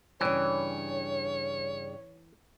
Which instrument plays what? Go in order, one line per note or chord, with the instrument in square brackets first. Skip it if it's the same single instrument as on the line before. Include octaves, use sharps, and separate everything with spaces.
[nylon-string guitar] G2 C#3 [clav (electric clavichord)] E3 [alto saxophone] C#5